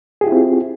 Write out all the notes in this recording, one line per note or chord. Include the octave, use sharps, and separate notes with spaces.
C4 E4 F4 G4 G#4